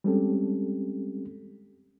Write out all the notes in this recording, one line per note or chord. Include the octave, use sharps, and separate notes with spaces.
G3 G#3 C4 C#4 G4 A4